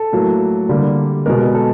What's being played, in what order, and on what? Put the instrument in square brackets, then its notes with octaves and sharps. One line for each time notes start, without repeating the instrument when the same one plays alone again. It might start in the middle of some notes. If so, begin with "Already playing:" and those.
Already playing: [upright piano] A4
A2 F#3 A#3
D3 G3 A#3
B2 G#3 B3 A#4
A4